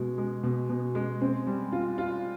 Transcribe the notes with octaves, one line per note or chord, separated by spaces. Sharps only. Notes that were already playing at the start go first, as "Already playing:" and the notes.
Already playing: B2 G#3
G#3
B2
B2
G#3
C4
G3
F4
F4